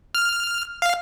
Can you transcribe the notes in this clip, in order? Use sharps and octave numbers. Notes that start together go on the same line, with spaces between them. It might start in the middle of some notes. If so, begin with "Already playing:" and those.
F6
F5